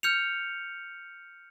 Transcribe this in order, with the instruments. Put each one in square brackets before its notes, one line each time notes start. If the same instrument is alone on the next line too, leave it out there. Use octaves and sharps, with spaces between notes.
[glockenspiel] F6 G6 C#7 F7